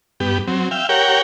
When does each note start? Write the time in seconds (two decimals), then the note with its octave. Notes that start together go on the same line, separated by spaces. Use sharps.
0.20 G2 B3 G4
0.47 F#3 C4
0.71 E5 F5 G5
0.89 G4 A#4 C#5 F#5 G5